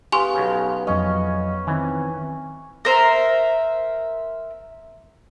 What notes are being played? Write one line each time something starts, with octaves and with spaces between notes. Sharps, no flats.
B3 G4 F5 G#5 C6 C#6
B1 C#3
F2 F#3 C#4 D#5
D#3 E3 C4
A#4 C5 E5